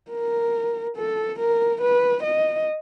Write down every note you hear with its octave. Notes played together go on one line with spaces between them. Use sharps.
A#4
A4
A#4
B4
D#5